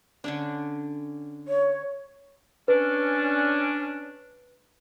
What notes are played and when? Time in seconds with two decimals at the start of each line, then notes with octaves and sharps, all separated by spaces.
0.24 D3 C#4 D4
1.48 C#5
2.68 C#4 D4 B4